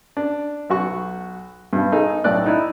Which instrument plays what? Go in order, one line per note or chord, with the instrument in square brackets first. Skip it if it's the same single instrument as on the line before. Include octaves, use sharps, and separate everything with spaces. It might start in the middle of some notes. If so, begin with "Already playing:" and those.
[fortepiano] D4
B1 F#4 C#6
G2 B2
D#4 G#4 A4
B1 A2 D5 F#6
D#4 E4